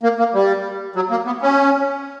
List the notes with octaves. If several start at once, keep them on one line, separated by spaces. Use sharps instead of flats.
A#3
A#3
G3
F#3
A#3
B3
C#4